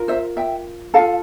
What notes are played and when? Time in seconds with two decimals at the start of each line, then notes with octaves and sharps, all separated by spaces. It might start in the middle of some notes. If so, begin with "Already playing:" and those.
Already playing: F4 A#4
0.08 C5 E5
0.37 E5 G5
0.94 F4 A4 F5 A5